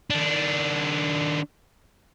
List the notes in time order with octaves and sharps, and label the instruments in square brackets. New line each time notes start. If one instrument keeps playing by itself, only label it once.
[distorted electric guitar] D#3 D4